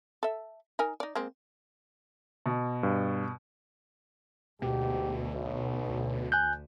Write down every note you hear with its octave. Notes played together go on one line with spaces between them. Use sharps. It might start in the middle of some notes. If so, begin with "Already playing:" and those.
A4 E5
D#4 A#4 G#5
D#4 D5
G#3 A#3 C4
B2
G2
D2 G#2 B2 G4
B1
D2
G#5 F#6 G6